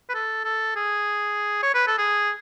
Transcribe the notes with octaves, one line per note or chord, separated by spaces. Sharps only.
B4
A4
A4
G#4
C#5
B4
A4
G#4